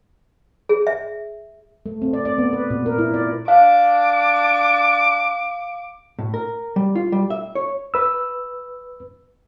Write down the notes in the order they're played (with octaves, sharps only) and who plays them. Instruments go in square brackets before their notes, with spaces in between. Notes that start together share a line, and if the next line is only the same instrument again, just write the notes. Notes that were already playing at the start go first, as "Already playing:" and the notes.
[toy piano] G#4
E5
[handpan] A3
C4
D5
D5
B3
B4
A#2
A#4
E4
D5
[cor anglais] D4 [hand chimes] F5 [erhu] D6
[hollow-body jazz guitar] A2
A#4
G3
F4
G3
E5
C#5
[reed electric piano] B4 E6